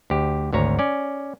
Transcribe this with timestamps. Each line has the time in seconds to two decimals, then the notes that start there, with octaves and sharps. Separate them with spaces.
0.10 D2 G4
0.53 G#1 D2 C#5 A#5
0.79 C#4 D5